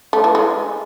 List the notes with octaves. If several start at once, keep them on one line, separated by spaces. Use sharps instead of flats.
A3
E3
G#3